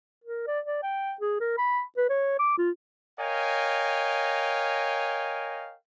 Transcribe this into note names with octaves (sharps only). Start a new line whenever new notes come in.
A#4
D5
D5
G5
G#4
A#4
B5
B4
C#5
D6
F4
A#4 C#5 D#5 F5 G5 G#5